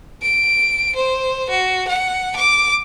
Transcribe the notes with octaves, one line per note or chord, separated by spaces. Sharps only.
D7
C5
F#4
F#5
D6